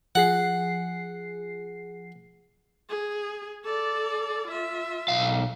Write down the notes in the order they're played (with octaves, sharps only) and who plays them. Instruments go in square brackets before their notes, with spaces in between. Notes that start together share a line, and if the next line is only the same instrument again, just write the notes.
[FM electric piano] F3 G#4 C7 [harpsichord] F#5
[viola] G#4
A4 D5
F4 E5
[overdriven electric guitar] B1 F5